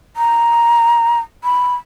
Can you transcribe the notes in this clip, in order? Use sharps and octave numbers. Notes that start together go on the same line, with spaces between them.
A#5
B5